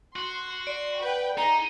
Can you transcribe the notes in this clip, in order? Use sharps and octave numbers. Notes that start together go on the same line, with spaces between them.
F#4 C6
D5 C6
B4 F#5 G5
D#4 G#4 A#5